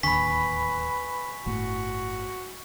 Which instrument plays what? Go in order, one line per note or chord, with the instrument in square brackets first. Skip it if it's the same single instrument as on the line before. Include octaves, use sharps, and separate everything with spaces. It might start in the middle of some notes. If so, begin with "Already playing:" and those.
[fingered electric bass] D1 D#2 D3 [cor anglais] B4 [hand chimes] G#5 B5 [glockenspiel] C#6 B6
[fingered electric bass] G1 A2 [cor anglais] F#4